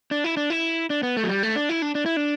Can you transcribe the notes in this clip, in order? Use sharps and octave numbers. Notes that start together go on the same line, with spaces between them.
D4
E4
D4
E4
D4
B3
A3
F#3
G3
A3
D4
E4
D4
D4
E4
D4